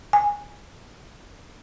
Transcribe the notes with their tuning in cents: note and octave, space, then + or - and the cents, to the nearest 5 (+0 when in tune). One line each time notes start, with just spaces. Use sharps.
G#5 -10